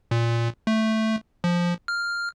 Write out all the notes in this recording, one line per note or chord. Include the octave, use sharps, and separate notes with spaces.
A#2
A3
F3
F6